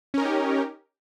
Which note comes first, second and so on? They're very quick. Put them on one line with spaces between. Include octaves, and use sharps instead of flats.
C#4 A#4 D#4 G4